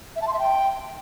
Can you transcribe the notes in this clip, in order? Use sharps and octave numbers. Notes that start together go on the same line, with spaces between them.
E5
A5
C6
E5
G5